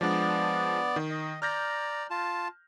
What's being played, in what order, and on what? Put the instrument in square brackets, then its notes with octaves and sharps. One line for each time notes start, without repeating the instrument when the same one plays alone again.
[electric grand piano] F3 G#3 D4 [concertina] B3 D5
[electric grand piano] D#3
[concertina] D#5
[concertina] D5 A#5 [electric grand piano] F6 G6 A#6
[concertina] F4 A5